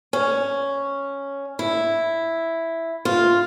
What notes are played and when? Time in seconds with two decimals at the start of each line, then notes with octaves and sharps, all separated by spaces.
0.13 C#4
1.59 E4
3.05 F4